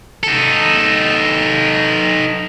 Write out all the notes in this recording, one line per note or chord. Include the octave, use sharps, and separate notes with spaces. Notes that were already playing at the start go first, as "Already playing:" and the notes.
D#4 A4